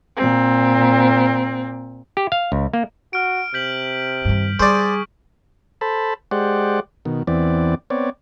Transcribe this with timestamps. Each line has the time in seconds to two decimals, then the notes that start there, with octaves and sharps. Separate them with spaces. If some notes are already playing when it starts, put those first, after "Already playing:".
0.17 A#2 C4
2.17 G4
2.32 F5
2.52 C#2
2.73 A#3
3.13 F#4 F6 D7
3.54 C3 G6 B6 F#7
4.25 G2 D#3
4.60 G3 G#4 C5 D5 C#6
5.81 A4 C5 A5 B5
6.31 G#3 G4 C5 D5 F#5
7.05 B2 D#3
7.27 E2 E3 B3 C4 D5
7.90 B3 C4 C#5 D5